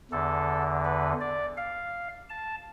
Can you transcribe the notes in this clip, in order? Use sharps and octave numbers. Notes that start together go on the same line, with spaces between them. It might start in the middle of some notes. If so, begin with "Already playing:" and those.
E2 D3 A4
B4
D5
F5
A5